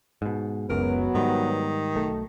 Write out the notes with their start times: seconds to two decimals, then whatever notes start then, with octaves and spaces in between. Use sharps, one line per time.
0.22 G#2 B2
0.69 F#1 C#2 F#2 F#3 B3 A#4
1.15 G#2 D#3 G3
1.96 B1 A3